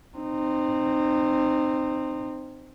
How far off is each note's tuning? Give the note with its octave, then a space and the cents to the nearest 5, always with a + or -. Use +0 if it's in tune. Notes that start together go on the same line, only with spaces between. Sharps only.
C4 +0 D#4 -25